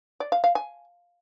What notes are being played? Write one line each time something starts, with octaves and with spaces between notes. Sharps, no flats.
D5
F5
F5
G#5